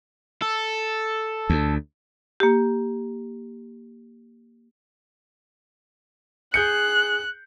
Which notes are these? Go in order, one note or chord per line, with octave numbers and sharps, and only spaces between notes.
A4
D2
A#3 G4
G#4 F#6 G6 C#7